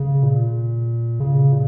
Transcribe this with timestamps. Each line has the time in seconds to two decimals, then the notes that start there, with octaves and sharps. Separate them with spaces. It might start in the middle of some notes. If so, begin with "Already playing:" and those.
Already playing: C#3
0.23 A#2
1.20 C#3
1.52 A#2